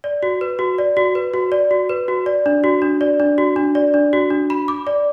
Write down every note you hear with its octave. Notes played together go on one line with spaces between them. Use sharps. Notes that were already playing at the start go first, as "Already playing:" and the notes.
D5
F#4
B4
F#4
D5
F#4
B4
F#4
D5
F#4
B4
F#4
D5
D4
F#4
D4
D5
D4
F#4
D4
D5
D4
F#4
D4
B5
D6
D5